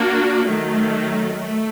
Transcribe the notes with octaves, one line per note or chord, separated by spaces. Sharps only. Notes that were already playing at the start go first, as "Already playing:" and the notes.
Already playing: A#3 D4 F#4
D#3 F#3 A3
A3